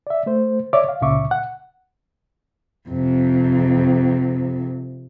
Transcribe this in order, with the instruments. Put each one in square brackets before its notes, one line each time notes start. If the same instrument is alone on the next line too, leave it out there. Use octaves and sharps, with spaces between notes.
[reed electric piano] D5 E5
A3 C5
C#5 D5 E5 D6
F5
C#2 A#2 C#3 E5 C#6 D6
F#5
[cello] F2 C3